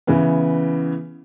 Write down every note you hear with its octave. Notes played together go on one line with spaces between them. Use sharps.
C#3 E3 B3